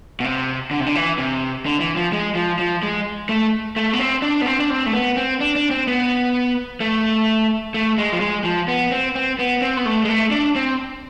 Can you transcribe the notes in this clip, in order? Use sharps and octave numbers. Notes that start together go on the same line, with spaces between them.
B2
C3
D3
C3
D3
E3
C3
D3
E3
F3
G#3
F3
F3
G#3
A3
A3
B3
C4
D4
B3
C4
D4
C4
A3
B3
C4
D4
D4
C4
B3
A3
A3
G#3
F3
G#3
F3
B3
C4
C4
B3
C4
B3
A3
G#3
A3
D4
C4